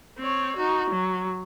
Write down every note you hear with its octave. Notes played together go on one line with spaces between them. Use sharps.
C4 C#5
D#4 F#4
F#3